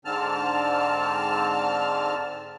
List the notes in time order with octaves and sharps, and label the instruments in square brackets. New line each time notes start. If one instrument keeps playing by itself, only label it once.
[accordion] G#2 D3 C4 A5 F6